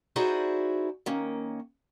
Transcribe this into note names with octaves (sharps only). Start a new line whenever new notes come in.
D#4 E4 F#4 G#4 C5 D5
D#3 A#3 C#4